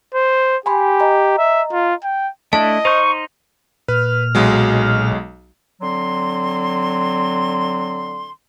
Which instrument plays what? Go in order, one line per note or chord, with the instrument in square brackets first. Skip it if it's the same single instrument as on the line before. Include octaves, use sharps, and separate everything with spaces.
[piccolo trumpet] C5
[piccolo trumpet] G4 [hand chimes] G#5 B5 C6
[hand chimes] D#5 A#5
[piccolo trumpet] E5
F4
G5
[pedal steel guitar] A3 D4 E4 [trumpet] D#5 [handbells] A5
[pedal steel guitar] D#4 C6 G6 [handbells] C5 [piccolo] C#6
[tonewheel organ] A#2 F6 [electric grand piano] B4
[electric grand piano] B1 F#3 G#3
[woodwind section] D3 F#3 C4 C6